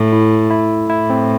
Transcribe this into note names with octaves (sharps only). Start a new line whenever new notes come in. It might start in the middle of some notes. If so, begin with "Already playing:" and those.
Already playing: A2
E4
E4
A2 E4
C4